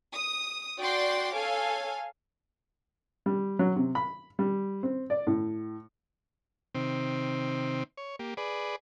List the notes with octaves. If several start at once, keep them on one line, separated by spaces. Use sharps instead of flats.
D#6
F#4 D5 G5 C6 D6
A4 C#5 F5 G#5
G3
F#3
C3
B5
G3
C4
D5
A2
C3 D#3 C4
C#5
A#3 G4
G#4 B4 D5